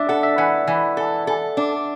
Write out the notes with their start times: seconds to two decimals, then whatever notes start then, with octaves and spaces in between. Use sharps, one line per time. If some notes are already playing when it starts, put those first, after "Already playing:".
Already playing: D4 D5 E5
0.09 A4 F#5
0.23 E5
0.38 E3 F#5
0.68 E3
0.97 A4
1.27 A4
1.57 D4